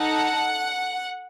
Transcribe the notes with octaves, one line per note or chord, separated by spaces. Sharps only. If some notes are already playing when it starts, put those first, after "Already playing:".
Already playing: D#4 A4 F#5